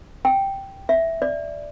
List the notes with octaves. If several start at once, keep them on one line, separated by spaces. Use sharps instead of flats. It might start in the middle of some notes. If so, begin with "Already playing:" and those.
G5
E5
D5